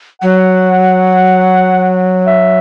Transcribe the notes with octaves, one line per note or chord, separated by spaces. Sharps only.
F#3 F#5
E5